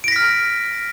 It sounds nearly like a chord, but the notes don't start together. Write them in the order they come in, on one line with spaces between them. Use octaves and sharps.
D7 A#6 B6 F6